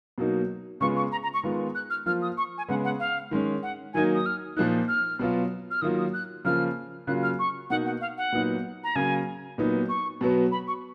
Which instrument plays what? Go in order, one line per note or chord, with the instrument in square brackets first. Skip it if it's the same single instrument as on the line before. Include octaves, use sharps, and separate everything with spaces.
[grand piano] B2 F#3 A#3 D#4
[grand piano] C#3 G#3 B3 F4 [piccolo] C#6
[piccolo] C#6
A#5
A#5
C#6
[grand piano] D#3 G#3 B3 F4
[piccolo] F#6
F6
[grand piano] F3 A#3 F4 [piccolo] F6
[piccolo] D#6
C#6
G#5
[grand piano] C#3 G#3 B3 [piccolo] F#5
[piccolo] F#5
F5
[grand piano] D#3 G#3 C#4
[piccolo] F#5
[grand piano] D#3 F#3 A#3 D#4 [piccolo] G#5
[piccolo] D#6
F6
[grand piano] A#2 F3 A#3 D#4 [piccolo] F#6
[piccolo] F6
[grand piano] B2 F#3 B3 F4
[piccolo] F6
[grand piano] D#3 F#3 A#3 F4 [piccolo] D#6
[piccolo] D#6
F#6
[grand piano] C#3 F3 A#3 F4 [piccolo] F6
[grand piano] C#3 F#3 A#3 F4 [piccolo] F#6
[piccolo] F6
C#6
[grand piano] B2 A#3 D#4 [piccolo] F#5
[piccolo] F#5
F5
F#5
[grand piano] A#2 F#3 B3 D#4
[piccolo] A#5
[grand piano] C#3 F#3 A#3 [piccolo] G#5
[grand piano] A#2 F#3 B3 D#4
[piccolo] C#6
[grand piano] B2 F#3 B3
[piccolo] B5
C#6